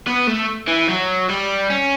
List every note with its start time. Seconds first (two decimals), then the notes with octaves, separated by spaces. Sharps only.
0.07 B3
0.27 A3
0.68 E3
0.89 F#3
1.29 G3
1.70 C#4